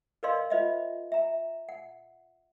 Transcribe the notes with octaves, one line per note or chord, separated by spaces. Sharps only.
A#4 B4 D5 D#5 F5 C6
F4 C5 D#5 E5
E5 A#5
F#5